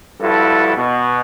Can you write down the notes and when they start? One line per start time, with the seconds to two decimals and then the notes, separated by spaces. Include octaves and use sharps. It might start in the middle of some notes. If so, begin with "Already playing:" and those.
0.21 G2 F3 E4 F#4 A4
0.76 B2